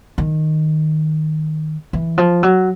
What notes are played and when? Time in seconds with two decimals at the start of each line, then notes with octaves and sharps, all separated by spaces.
0.18 D#3
1.93 E3
2.18 F3
2.43 F#3